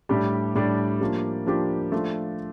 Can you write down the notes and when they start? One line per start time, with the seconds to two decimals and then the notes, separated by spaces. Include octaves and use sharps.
0.09 A2 G3 D4 G4
0.55 A2 G3 D4 G4
1.01 F3 A#3 D4 G4
1.46 F3 A#3 D4 G4
1.92 F3 A3 D4 F4